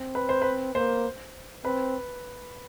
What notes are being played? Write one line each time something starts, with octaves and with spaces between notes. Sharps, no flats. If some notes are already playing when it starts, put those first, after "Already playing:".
Already playing: C4
B4
C5
B4
A#3 C5
C4 B4